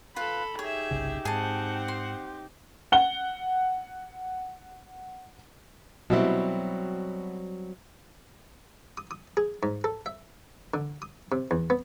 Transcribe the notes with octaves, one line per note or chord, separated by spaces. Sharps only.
F4 A4 B4 B5
D#4 G4 G#4 C#5 E5
G1 C2 C#3
G#2 C4 G#4 F#5 A5
C6
F#5 G7
B2 F#3 G3 C4 E4
D#6
D#6
G#4
G#2
A4
E5
D3
D#6
C3
E2
B3